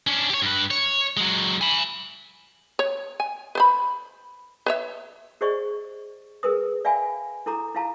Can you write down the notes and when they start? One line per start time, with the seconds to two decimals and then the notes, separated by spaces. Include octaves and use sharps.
0.07 C#4 D4
0.30 G4 C#5
0.42 G2 B4
0.71 C#5
1.17 F#3 G#3
1.61 G#5 B5
2.79 C#5
3.20 G#5
3.55 B4 C5 B5
4.66 B4 C#5 E5
5.41 G4 G#4 C5 D5 D#5 C#6
6.43 G#4 A#4 B4 D#6
6.85 D5 E5 F5 G5 G#5 B5
7.46 E4 A4 A#5 D6
7.75 E4 F4 F5 A5 A#5